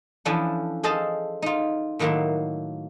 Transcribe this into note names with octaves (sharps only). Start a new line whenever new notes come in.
E3 F3 C#4 D4 E4 A4
G#4 A4 C5 D#5 F5 A5
D#4 F4
A2 D#3 F#3 A#3 E5 C6